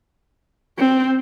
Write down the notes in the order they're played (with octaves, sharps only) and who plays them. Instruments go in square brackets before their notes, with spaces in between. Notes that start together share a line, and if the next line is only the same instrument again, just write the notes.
[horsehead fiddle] C4